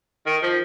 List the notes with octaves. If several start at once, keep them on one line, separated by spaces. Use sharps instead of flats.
D#3
F3